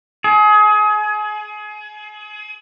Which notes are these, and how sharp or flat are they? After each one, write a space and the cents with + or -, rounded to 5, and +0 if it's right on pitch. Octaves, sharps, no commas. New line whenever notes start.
G#4 +30